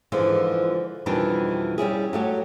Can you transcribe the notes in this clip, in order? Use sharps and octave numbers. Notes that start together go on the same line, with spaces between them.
G#2 D3 E3 F3 G#3
F2 B2 D#3 E3 G3 D4
G3 C#4 E4 G#4
F#3 A3 G4